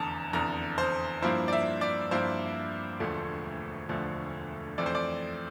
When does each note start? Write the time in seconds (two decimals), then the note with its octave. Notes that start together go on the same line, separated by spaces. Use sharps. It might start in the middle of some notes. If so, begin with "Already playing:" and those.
Already playing: F1 E2 D3 A5 A#5
0.33 F1 E2 D3 A#5
0.78 C5
1.22 G2 F3 A#3 E4 C5
1.48 D5
1.53 E5
1.81 D5
2.11 G2 F3 A#3 E4 C5
3.00 E1 D2 D3 F3 A3
3.89 E1 D2 D3 F3 A3
4.78 F2 E3 A3 C4 D5
4.86 C5
4.95 D5